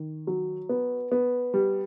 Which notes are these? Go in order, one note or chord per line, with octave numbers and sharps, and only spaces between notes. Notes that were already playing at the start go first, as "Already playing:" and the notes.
Already playing: D#3
F#3
B3
B3
G3